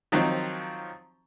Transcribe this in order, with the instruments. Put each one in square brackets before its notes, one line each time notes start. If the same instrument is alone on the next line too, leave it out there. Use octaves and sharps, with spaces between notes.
[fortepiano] D#3 F3 F#3 C4 D#4